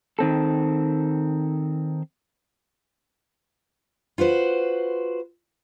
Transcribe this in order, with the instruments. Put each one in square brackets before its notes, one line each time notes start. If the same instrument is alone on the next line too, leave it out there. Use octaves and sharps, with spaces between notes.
[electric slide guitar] D#3 C4 A4
[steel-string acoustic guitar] F4 F#4 B4 C5